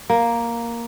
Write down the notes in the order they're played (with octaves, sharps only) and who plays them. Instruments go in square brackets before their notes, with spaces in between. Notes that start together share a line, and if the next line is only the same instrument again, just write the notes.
[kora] A#3